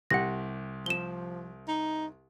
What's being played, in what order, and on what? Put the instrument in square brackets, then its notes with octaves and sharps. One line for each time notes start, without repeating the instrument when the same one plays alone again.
[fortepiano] C2 G4 F#6 [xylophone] F#5 A#6
[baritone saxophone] F3 [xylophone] E7 G7
[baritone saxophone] D#4